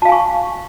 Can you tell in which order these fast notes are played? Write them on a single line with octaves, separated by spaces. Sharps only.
A5 F5 G#5 C#6